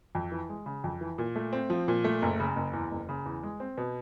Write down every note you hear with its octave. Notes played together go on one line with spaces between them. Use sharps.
F2
E3
G#3
C#3
F2
E3
A#2
A3
C4
F3
A#2
A3
F#1
C#3
F#1
E2
F#1
C#3
E2
G#3
C4
B2